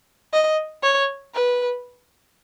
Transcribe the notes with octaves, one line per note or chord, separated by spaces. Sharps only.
D#5
C#5
B4